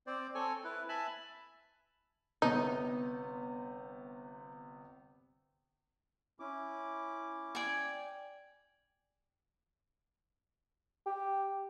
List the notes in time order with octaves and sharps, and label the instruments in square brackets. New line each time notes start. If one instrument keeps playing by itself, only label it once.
[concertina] C4 C5 D5
C4 A4 C#5 G#5
E4 B4
E5 G#5 A5 B5
[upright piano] G1 C3 B3 [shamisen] D#4
[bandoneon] C#4 E4 D6
[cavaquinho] D5 G5 G#5
[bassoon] G4